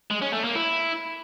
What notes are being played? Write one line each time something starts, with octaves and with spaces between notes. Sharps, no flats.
G#3
C#4
A3
A#3
E4